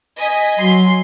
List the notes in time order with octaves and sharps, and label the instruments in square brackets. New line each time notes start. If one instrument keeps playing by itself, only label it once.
[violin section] D#5 G#5 B6
[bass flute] F#3 [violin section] C6